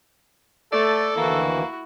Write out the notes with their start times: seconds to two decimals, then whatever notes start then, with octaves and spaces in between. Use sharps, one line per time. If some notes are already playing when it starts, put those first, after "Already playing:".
0.72 A3 A4 D5
1.16 D2 D#3 E3 A#3 E4 F#4